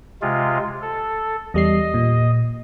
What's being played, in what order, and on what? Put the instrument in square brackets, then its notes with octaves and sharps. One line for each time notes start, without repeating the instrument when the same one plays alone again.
[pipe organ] C3 G#3 F4
A4
[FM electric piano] E2 G3 C7 [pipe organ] D#5
[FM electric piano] A#2